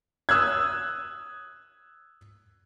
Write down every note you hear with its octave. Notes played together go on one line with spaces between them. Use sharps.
D#6 E6 F#6 G#6